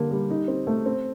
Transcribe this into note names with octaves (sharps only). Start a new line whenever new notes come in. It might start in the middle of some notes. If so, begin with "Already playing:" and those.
Already playing: D3 G3 A#3
G3
D#4
C4
A3
C4